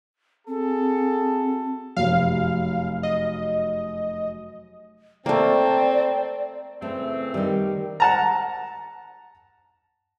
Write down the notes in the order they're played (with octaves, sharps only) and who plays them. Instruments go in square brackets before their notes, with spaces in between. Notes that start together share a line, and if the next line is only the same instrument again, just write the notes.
[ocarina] C4 [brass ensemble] F#4 G#4 A4
[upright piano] F1 F#2 [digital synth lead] F5
[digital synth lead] D#5
[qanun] A3 A#3 [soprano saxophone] C4 [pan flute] D5
[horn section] C#3 E3 C4 [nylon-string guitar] A3
[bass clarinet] D#3 [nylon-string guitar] G3 D#4
[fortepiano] F#5 A5 A#5